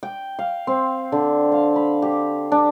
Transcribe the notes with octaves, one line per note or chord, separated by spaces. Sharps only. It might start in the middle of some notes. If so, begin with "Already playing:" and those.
G5
F5
C4
D3
F5
B5
G4
D4